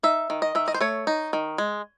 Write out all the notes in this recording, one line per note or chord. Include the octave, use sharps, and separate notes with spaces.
D#4 E5
D#3
D#5
D#3 E5
D#5
C5
A3 C#5
D#4
D#3
G#3